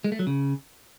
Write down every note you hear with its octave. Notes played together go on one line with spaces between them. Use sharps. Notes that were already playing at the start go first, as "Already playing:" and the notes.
G#3
A3
F#3
C#3